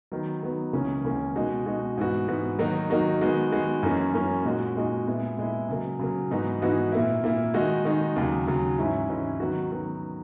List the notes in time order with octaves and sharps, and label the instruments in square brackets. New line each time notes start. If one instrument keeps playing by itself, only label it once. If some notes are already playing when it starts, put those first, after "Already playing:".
[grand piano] D#3 F#3 B3
D#3 F#3 B3
C#2 C#3 E3 A#3 C#4
C#2 C#3 E3 A#3 C#4
B2 G#3 D#4 F#4
B2 G#3 D#4 F#4
G#2 E3 B3 F#4
G#2 E3 B3 F#4
D#3 F#3 A#3 D#4 F#4
D#3 F#3 A#3 D#4 F#4
D#3 G#3 B3 F#4
D#3 G#3 B3 F#4
F#2 E3 A#3 C#4
F#2 E3 A#3 C#4
A#2 G#3 D#4 F#4
A#2 G#3 D#4 F#4
A#2 G#3 B3 E4
A#2 G#3 B3 E4
C#3 F#3 A#3
C#3 F#3 A#3
G#2 E3 B3 D#4 F#4
G#2 E3 B3 D#4 F#4
A#2 A#3 E4
A#2 A#3 E4
D#3 G#3 D#4 F#4
D#3 G#3 D#4 F#4
D#2 C#3 F#3
D#2 C#3 F#3
G#2 E3 G#3 C#4 E4
G#2 E3 G#3 C#4 E4
D#3 F#3 B3 F#4
D#3 F#3 B3 F#4